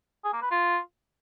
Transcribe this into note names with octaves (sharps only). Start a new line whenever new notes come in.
G#4
A#3
B4
F4